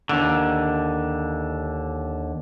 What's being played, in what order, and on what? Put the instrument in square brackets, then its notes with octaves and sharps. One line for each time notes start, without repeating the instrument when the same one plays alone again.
[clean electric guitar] D#2 D3